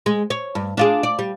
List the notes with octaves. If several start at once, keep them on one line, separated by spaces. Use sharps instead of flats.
G#3
C#5
G2
D4 F4 G#4
D5
G3